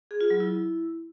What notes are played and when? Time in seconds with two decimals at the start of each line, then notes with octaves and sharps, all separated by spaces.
0.11 G#4
0.21 F4
0.30 F#3
0.40 E4